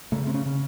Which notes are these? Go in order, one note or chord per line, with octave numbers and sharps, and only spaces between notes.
C#3 A3
C4
C#4
C#3